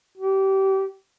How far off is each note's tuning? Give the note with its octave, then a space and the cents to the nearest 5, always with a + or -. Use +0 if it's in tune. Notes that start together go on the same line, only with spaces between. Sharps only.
G4 -25